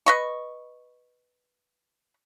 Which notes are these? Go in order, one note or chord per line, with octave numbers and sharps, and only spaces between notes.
B4 D#5 C#6